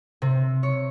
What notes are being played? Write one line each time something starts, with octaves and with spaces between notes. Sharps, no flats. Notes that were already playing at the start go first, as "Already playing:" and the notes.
C3
C#5